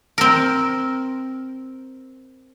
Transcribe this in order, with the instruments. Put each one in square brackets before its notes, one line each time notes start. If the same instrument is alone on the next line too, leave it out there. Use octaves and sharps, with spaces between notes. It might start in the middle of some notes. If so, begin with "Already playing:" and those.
[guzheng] C4 A#4